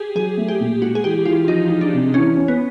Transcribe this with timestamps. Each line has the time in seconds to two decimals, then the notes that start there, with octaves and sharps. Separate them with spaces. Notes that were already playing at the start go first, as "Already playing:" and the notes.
Already playing: G4 G#4
0.15 F#3 G#4
0.37 A3
0.48 G4
0.59 A#2
0.81 G#3 F#4
0.95 G#4
1.04 E3 G4
1.25 E3 F4
1.48 F3 D#4
1.70 F3
1.81 D4
1.92 C3
2.14 E3 C#4
2.37 C#4
2.48 B3